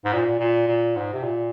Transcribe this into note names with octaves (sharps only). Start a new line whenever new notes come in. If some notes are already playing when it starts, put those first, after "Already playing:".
G#2
A#2
A#2
A#2
G#2
C3
A#2